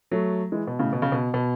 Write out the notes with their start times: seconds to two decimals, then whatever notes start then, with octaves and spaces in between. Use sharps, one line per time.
0.11 F#3 A3
0.52 E3 G#3
0.67 B2
0.79 A2 C#3
0.93 B2
1.02 C#3
1.12 B2
1.34 B2